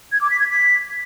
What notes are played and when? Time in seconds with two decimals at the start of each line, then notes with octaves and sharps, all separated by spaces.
0.12 G#6
0.21 D6
0.30 B6
0.40 G#6
0.49 B6